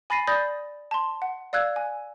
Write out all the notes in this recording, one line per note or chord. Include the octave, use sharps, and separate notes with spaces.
G#5 B5 A6 A#6 C7 D#7
D5 B5 D#6 G6 A6 A#6
A5 C6
F#5
D5 F5 E6 F#6 G#6
G#5